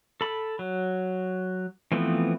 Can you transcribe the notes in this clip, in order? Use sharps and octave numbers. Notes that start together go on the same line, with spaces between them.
A4 B5
F#3
E3 F3 A3 B3 C4